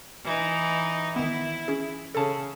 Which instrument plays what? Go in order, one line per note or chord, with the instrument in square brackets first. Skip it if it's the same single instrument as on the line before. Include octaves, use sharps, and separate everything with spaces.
[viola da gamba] E3 D#4
[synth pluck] D#3 B3 [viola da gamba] E4
[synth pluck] C#4 G#4
[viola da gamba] C#3 [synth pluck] A4 A5